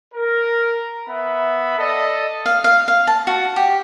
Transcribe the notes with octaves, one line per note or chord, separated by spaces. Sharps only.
A#4
B3 E5 B5
A4 D5 D#5
F5
F5
F5
A5
F#4
G4